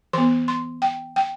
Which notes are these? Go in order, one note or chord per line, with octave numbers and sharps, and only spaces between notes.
E3 B3 C6
C6
G5
G5